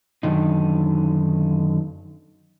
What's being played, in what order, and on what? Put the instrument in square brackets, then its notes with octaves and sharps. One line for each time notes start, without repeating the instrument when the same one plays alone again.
[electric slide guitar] F#2 D3 D#3 D#4